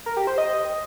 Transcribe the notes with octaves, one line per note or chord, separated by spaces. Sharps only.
A#4
G4
C5
D#5